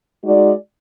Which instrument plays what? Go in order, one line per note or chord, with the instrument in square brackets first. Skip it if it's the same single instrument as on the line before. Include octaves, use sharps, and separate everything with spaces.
[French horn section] G#3 D#4 F#4 D5